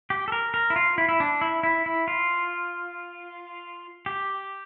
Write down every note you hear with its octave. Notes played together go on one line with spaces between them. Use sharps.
G4
A4
A#4
A#4
E4
F4
E4
E4
D4
E4
E4
E4
F4
G4